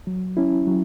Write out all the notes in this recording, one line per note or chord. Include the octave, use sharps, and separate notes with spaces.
F#3
C#4 E4
F#3